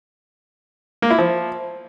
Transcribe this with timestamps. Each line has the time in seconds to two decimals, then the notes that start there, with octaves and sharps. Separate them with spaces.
1.02 A#3
1.10 E4
1.19 F3